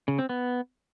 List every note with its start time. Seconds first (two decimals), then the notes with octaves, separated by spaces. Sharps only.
0.08 C#3
0.19 C4
0.29 B3